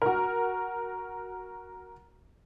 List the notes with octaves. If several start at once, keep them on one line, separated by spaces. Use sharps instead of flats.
F#4 A#4